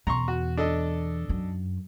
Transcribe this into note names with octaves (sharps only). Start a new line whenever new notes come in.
E2 B2 A#5 C6 C#6
F#4
D4 A4 D#5
F#2